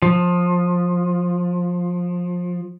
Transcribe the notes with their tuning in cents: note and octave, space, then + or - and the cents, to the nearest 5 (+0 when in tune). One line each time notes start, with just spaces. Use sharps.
F3 +20